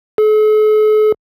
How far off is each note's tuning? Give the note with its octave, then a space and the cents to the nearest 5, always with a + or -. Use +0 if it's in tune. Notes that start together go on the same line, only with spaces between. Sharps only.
A4 -45